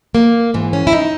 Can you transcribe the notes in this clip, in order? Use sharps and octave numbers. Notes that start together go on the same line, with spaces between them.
A#3
G#2 E3
C#4
E4
D#4